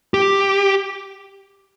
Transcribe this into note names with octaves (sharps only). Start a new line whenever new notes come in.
G4